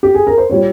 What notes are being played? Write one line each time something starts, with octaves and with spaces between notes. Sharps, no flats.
G4
G#4
A#4
C5
A#2 G3 C#5